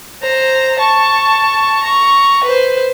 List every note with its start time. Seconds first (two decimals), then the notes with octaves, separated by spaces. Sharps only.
0.22 C5 A#5
0.79 A5 C#6
1.83 A#5 C#6
2.44 B4 C5